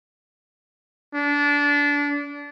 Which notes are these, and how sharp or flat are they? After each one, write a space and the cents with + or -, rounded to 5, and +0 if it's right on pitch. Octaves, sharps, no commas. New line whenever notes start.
D4 -25